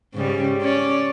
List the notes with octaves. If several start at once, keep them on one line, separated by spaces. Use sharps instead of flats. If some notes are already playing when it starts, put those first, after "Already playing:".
G#2 C#3 G3
C#4 C#5 D5